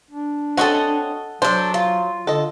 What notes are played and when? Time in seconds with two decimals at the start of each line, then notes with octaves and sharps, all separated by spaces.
0.11 D4
0.57 C4 C#4 F#4 A4 D#5 F#5
1.42 F#3 D4 A4 C5
1.74 F4
2.27 D3 A4 D#5